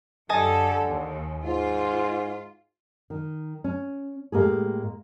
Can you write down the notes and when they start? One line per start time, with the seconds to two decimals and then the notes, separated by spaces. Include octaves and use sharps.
0.29 F#2 D3 G4 A4 D#5 G#5 A5
0.85 D#2
1.45 G#2 F4
3.10 D#3
3.64 C#4
4.32 A2 G#3 A#3 G4 G#4